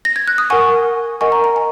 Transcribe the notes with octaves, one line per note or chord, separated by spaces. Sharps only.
A#6
G#6
F#6
D#6
A#4 F#5 G#5 C#6
A#4 D#5 F#5 G#5 C#6
A#5
A#5
G#5